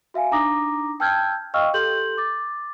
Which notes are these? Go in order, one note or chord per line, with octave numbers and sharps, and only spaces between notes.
F#4 E5 F5 G#5
D4 D#4 A#5 D6 D#6 A#6
G5 A5 E6 F6 G6 G#6
D#5 F5 G5 C#6 E6 F6
G4 A4 C6 G6 F#7
D6 A6